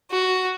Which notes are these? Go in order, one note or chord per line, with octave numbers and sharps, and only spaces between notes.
F#4